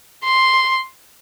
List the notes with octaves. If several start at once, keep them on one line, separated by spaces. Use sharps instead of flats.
C6